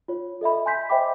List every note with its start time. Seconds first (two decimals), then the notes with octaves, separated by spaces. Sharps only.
0.08 F4 C#5
0.41 A4 D#5 E5 B5
0.66 G#5 C6 G6 B6
0.90 C5 D#5 E5 G5 B5 D6